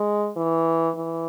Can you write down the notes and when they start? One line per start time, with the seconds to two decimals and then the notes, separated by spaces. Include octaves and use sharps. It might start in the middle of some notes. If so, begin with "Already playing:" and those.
Already playing: G#3
0.36 E3
0.96 E3